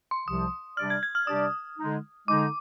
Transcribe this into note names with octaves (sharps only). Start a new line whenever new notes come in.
C6
C2 C3 F3 D#6
C3 G3 D4 G4 D5 F6
G#6
G#6
F6
C3 G3 D4 G4 D5 D#6
D3 G#3 D#4
D3 G#3 D#4 D6